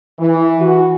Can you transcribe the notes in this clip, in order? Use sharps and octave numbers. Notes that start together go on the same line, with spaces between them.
E3
F#4